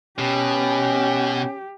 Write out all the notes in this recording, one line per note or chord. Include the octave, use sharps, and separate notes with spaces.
B2 C#4 G4